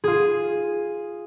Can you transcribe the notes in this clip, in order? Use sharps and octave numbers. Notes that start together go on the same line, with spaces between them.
F4 G#4